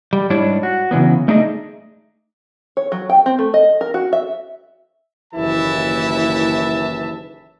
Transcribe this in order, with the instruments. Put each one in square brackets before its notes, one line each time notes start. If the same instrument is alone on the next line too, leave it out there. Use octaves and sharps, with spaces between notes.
[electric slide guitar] G3
G#2 G3 D4 E4 C#5 D5
F#4
C#3 E3 F#3 B3
A3 D4 D#4 G#4 D#5
[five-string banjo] C#5
F#3
G5
C4
A3
D#5
A#4
F#4
E5
[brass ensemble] F#1 D#2 E3 E4 E5 A5